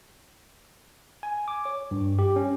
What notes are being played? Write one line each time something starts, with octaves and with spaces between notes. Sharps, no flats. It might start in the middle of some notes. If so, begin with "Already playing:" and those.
G#5
D6
C#5
G2
G4
C#4